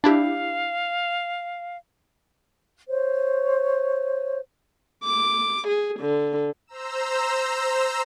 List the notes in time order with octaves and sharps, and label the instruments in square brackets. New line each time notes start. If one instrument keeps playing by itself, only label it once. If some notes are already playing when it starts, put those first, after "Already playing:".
[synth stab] D4 E4 G4 [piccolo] F5
[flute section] C5 C#5
[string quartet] D6
G#4
D3
[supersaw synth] C5 A#5 E6